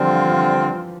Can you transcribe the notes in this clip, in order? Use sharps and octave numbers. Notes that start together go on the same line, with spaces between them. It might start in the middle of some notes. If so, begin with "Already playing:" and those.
Already playing: D3 E3 F3 G3 C4 F4
F3